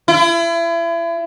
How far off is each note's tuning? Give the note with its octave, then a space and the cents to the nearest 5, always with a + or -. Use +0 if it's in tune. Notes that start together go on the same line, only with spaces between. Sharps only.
E4 +35